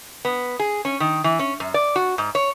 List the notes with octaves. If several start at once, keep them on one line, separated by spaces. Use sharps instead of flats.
B3
G#4
C#4
D#3
E3
C#4
F#2
D5
F#4
G#2
C#5